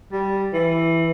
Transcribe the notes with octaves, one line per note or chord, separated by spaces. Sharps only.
G3
E3